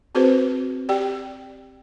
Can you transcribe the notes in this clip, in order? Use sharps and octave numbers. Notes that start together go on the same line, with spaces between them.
C4 F#4 G#4 B4 C5
G4 D5 G5